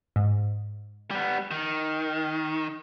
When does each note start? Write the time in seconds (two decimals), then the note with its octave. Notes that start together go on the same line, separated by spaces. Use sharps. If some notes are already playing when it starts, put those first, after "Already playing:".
0.16 G#2
1.11 G3 B3
1.51 D#3